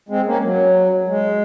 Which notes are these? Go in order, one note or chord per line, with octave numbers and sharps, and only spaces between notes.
G#3 C4
A#3 C#4
F#3
G#3